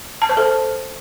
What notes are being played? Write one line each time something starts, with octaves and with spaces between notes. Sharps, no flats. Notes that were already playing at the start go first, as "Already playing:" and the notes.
A5
C5
A4